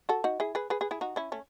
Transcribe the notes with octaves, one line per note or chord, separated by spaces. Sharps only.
F#4 A4
D#4 F#4
E4 G#4
G#4 B4
G#4 B4
G#4 B4
E4 G#4
D#4 F#4
C#4 E4
A3 C#4